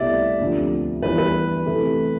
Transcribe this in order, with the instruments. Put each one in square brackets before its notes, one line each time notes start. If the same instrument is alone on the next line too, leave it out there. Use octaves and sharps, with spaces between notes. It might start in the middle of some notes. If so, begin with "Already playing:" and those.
Already playing: [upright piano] C2 B2 A3 E4 G4 [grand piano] D5 E5
[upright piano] D2 C3 F3
[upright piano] E3 G3 B3 [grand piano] B4
[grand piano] B4
[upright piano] C3 E3 A3